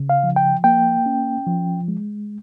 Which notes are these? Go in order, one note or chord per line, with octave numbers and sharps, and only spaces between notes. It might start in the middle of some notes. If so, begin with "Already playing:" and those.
Already playing: C#3
F5
F3
G5
A#3 G5
C#4
F3
G#3